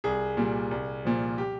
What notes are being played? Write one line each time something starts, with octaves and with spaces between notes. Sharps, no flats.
C2 G#4
A#2 G3
C2
A#2 F3
G4